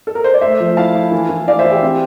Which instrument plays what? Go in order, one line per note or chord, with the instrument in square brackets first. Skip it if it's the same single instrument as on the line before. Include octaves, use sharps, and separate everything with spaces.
[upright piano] A4
A#4
C5
D5
A3 C5 E5
F3
E4 F5 A5
E4
E3
E3
E3 D5 F5
C5 E5
E3
G4
C4